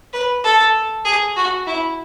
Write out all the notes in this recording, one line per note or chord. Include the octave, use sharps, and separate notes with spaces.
B4
A4
G#4
F#4
E4